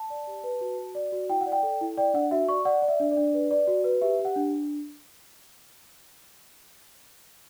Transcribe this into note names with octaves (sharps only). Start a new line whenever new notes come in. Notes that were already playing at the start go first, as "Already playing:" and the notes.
Already playing: A5
D5
G4
B4
F#4
F#4
D5
F#4
E4 G5
F#5
D5
G5
A4
E4
D5 G5
D4 F#5
F#4 E5
D5 C#6
D5 F#5
D5
E5
D4
D5
D4
B4
D5
F#4
B4
G4 E5
G4
F#5
D4